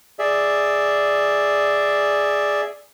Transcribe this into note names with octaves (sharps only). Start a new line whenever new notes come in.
G#4 D5 E5